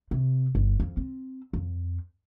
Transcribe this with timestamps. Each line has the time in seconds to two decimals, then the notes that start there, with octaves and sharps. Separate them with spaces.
0.11 C3
0.55 G1
0.80 F2
0.97 C4
1.53 F2